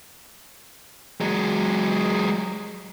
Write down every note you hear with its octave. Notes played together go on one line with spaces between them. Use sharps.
F#3 G#3